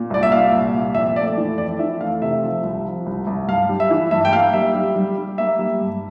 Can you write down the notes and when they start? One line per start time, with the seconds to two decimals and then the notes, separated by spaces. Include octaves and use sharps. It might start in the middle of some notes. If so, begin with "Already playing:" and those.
Already playing: A#2
0.10 C2 D5
0.23 E5
0.32 A#2 F5
0.53 C2
0.74 A#2
0.95 F2 E5
1.16 A3 D5
1.37 E3
1.58 F2 D5
1.79 E3 E5
2.01 A3 F5
2.22 C3 E5
2.43 F3
2.64 C2
2.85 F3
3.06 C2
3.27 C2
3.48 G2 F5
3.69 G3
3.80 E5
3.91 E3
4.11 G2 E5
4.25 G5
4.33 A#3 F5
4.53 G3 E5
4.75 G3
4.96 G3
5.18 G3
5.38 A#3 E5
5.59 G3
5.81 G2